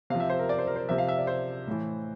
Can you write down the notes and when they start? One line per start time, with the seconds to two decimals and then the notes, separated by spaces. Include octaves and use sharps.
0.10 C3 F5
0.15 F3
0.20 E5
0.30 C5
0.39 A#4
0.49 D5
0.58 C5
0.67 A#4
0.76 C5
0.89 C3 F3 E5
0.98 F5
1.08 E5
1.18 D5
1.27 C5
1.67 A2 E3